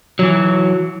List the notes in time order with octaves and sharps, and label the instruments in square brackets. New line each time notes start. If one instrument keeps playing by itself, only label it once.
[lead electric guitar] E3 F#3